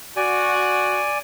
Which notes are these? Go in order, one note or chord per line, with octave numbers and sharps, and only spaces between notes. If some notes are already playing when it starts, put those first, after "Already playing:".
F#4 D5 G#5